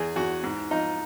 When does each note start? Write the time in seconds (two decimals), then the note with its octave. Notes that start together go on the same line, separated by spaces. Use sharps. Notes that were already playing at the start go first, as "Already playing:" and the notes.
Already playing: E2 G#4
0.16 E2 F#4
0.44 G#2
0.71 F3 D#4